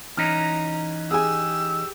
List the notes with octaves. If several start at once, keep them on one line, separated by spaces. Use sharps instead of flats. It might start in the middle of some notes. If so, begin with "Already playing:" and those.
E3 C#4 D#4 A#5 F6
G4 G#4 G#5 E6